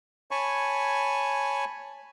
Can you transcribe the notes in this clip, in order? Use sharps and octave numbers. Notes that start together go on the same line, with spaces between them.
C#5 G#5 A5 B5 C#6